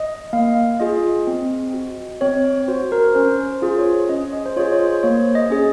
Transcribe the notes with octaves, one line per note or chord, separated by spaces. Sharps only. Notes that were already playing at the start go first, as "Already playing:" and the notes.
Already playing: D#5
A#3 F5
F4 G#4 D#5
C4
F#4
C4 C#5
C#5
F#4 C5
A#4
C#4 C5
C5
F4 G#4
C#5
C#4 D#5
D#5
C5
F4 G#4 C#5
C#5
C5
A#3 C#5
D#5
C#4 G#4